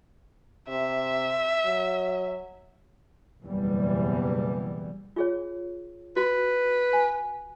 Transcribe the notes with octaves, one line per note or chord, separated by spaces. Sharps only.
C3 E5
F#3
F#1 E2 B2 E3 G3
F4 G#4 C#5
F#4 B4
G#5